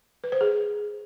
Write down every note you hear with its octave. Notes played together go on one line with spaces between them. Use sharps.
B4
C5
G#4